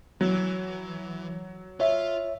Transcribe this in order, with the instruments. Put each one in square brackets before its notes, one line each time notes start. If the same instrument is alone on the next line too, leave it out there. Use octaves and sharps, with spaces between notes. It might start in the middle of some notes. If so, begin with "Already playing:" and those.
[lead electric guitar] E3 [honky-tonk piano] F#3
[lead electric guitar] F4 [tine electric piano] C#5 E5